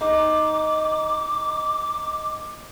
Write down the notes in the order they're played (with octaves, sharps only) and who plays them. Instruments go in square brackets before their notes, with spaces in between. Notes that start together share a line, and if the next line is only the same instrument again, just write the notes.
[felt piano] D#4 [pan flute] D6